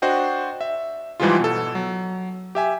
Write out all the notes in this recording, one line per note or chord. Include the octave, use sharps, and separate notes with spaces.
D4 F#4 C5 D#5 G5
E5
G#2 E3 F3 G3 G#3 F4
B2 A4
F#3
G4 E5 G#5